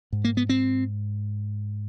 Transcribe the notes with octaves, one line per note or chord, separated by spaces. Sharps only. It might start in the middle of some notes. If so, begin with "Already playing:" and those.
G#2
A#3
B3
C4